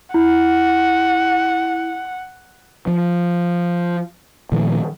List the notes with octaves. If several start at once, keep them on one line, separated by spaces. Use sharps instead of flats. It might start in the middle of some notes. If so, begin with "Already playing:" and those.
E4 F#5
F3
A#2 D#3 F3 A3